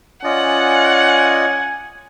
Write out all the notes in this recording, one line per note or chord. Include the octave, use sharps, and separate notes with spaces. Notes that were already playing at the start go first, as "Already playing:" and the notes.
C#4 F4 D5 D#5 F#5 G#5